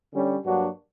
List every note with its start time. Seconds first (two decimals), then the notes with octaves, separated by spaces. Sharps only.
0.13 D3 G3 C#4
0.44 G2 F#3 A#3 D4 F#4